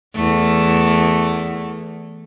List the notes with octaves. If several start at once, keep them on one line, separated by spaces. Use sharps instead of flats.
E2 A3